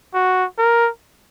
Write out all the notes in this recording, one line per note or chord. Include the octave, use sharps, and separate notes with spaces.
F#4
A#4